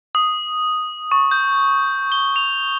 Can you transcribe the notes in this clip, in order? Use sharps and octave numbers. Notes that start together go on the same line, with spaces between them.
D#6
C#6
G6
G7
F7